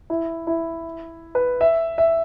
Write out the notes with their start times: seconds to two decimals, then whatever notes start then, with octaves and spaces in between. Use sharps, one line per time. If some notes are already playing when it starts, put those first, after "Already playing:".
0.10 E4
0.47 E4
1.35 B4
1.61 E5
1.98 E5